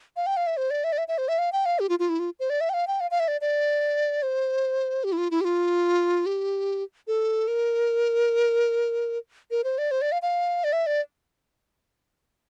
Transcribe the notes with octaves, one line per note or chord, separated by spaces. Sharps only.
F5
G5
F5
E5
C5
D5
E5
D5
E5
E5
C5
E5
F5
G5
F5
G4
F4
F4
E4
F4
C5
D5
E5
G5
F5
G5
F5
F5
E5
D5
D5
C5
G4
E4
F4
E4
G4
F4
G4
A4
A#4
A#4
C5
D5
C5
D5
F5
F5
D5
E5
D5